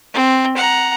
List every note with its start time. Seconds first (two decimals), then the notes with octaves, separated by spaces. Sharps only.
0.13 C4
0.57 F#5 A#5